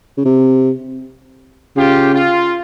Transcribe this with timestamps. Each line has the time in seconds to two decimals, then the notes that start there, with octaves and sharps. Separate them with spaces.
0.18 C#3
0.25 C3
1.76 C#3 F4 G4
2.15 F4